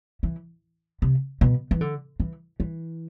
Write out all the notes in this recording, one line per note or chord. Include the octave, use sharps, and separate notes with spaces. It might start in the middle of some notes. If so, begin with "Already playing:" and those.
E3
C3
B2
E3
D3
E3
E3